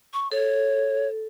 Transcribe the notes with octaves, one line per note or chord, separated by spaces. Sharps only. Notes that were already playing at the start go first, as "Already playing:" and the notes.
C#6
A4 C#5